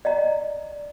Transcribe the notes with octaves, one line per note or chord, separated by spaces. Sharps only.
D5 D#5 A#5